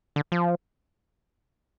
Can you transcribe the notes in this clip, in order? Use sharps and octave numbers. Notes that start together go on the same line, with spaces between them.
D3
F3